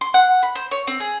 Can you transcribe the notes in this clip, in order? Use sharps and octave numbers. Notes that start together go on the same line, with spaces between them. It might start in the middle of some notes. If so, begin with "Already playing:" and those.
C6
F#5
B5
C5
C#5
C4
G#4